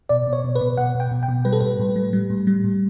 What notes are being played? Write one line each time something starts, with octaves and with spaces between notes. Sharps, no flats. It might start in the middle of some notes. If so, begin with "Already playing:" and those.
B2 D5
B2
C#5
B2
B4
B2
B2 F#5
B2
G5
B2
G5
B2
G3 B4
A4
A2 B4
A2
G3
G3
A2
G3
A2